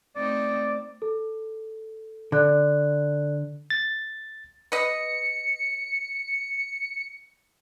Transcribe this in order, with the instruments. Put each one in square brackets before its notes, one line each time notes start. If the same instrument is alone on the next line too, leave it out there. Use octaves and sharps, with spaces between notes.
[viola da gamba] A3 C4 D#4 [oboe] D5
[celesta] A4
[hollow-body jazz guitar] D3 [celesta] A4 D5 F#6
[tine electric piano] A6
[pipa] B4 D#5 [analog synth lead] C#7